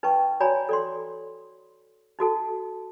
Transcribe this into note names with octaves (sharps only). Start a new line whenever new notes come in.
D#4 B4 G5 A5 C#6
F#4 C#5 D5 G#5 A#5 B5
A4 D5 C6
D#4 F#4 A4 A5